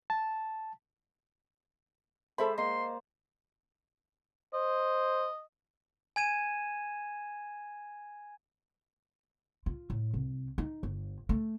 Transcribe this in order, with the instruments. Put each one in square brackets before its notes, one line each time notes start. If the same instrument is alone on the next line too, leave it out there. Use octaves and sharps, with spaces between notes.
[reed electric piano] A5
[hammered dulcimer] G#3 C5 D5 [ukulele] A4 E5 B5
[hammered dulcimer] A#3 [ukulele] D#5 [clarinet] C6
[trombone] C5 [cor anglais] D#5
[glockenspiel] G#5 G#6 D#7 E7
[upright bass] F4
A2
C2
D#4
G1
A3